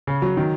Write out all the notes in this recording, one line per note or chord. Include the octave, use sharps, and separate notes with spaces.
C#3
F#3
D#3